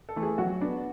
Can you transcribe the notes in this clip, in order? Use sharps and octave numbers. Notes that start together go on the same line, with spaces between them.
A4
E3 A3
G#4
F#3 F#4
B3 D4